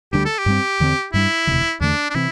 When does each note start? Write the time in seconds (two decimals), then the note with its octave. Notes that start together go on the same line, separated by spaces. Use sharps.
0.13 D2 D3 G3 D4 G4
0.25 A4
0.38 G4
0.46 G2 G3 C4
0.80 E2 D3 A3 C4
1.13 G2 G3 D4 E4
1.47 E1 D2 C3 E3
1.80 E2 D3 A3 D4
2.10 D4
2.15 C3 E3 C4 E4